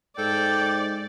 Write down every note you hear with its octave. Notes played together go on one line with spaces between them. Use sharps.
G#2 A4 D5 G5